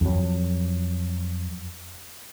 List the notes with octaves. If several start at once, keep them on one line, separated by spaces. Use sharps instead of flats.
F2 F#3